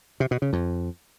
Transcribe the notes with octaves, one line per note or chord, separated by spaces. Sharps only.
C3
B2
C#3
F2